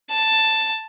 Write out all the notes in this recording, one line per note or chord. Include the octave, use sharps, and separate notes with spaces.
A5